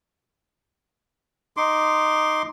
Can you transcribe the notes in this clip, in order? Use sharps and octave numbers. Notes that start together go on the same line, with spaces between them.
D#4 C6 D6